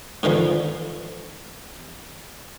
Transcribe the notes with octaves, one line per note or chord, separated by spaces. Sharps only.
G#2 D3 E3 F3